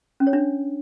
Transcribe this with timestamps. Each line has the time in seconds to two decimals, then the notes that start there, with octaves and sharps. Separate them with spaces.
0.20 C#4
0.27 C#5
0.33 D4